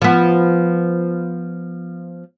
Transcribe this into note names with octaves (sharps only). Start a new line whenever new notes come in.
F3 B3